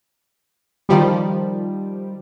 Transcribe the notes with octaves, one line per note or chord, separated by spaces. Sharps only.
D#3 F3 G3